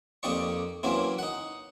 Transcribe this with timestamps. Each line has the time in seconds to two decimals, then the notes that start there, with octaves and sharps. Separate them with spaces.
0.23 F2 A#3 D#4 G4 D5 C#6
0.83 F#2 E3 F#3 A#3 C4 E4
1.19 D#4 F#5